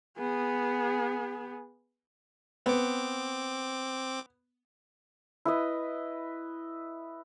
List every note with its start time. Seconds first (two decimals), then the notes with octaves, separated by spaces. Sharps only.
0.18 B3 G#4
2.66 B3 C4 D6
5.45 E4 B4 D#5